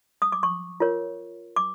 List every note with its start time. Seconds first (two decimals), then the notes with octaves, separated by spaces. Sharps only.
0.22 D#6
0.32 D6
0.43 C#6
0.80 F4 A#4 C#5
1.56 D6